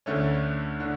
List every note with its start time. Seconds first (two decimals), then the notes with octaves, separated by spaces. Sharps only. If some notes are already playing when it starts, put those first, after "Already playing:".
0.06 D2 D3 A3 C#4
0.80 D3